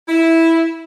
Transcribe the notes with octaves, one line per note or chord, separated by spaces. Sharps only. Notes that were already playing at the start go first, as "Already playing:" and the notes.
E4